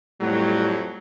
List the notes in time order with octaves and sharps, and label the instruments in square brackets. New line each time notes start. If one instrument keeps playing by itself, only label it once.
[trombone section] F2 F#3 [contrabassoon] A2 [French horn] G3